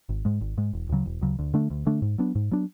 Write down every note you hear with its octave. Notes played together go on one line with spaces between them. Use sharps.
G#1
G#2 G#3
G#1
G#2 G#3
E1
D2 C#3 F#3
E1
D2 C#3 F#3
D2
D3 A3 D4
D2
D3 A3 D4
G#2
F#3 B3 D4
G#2
F#3 B3 D4